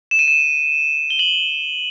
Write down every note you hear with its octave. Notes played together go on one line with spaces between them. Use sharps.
E7
D#7
E7
G7
F#7